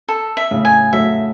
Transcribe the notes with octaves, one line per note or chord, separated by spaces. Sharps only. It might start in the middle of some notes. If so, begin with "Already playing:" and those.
A4
E5
A2 C#3
G#5
F#3 A3 E5